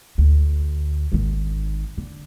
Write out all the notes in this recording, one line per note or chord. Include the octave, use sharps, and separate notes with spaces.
D2
G#1 D#3
D3